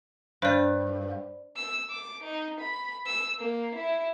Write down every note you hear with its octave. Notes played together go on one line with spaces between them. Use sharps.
G2 C5 D5
E6
D6
D#4
B5
E6
A#3
E4